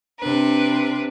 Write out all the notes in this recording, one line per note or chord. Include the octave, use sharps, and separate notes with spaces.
C3 D4 B4